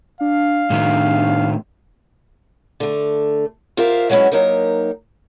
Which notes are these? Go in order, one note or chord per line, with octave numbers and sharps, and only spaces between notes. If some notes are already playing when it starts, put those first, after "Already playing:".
D4 F5
A2 D#3
D3 A3
F4 G4 A#4 C5 E5 F5
F#3 G#3 B3 C#4 E4
F#3 A#3 D#4 G4 A#4